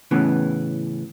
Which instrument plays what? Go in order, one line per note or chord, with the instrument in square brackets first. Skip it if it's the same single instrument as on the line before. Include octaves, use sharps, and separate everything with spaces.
[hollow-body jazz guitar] A2 C#3 E3 B3